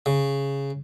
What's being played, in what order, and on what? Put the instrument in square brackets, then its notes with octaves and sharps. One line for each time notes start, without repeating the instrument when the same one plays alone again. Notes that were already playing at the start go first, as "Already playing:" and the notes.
[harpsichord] C#3